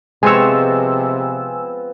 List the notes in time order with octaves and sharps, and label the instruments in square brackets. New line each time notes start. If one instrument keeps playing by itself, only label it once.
[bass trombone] C3 [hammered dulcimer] F3 B3 C4 [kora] G#3 C#5 [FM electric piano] G#5 E6